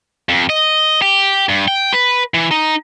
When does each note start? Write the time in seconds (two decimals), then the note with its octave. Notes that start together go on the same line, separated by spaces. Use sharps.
0.29 F2
0.50 D#5
1.02 G4
1.49 G2
1.68 G5
1.93 B4
2.34 E3
2.51 D#4